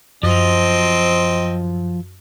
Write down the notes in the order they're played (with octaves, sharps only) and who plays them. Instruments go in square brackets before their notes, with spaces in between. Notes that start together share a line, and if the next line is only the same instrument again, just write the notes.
[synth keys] F#2 [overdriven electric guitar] F3 [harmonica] C4 D#5